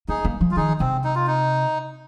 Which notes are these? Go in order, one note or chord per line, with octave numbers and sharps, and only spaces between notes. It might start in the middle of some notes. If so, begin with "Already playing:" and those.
A#3 D#4 G#4
A#3
F3
F4
D#3 D#4 G#4
C3 C4
D#4
F4
D#4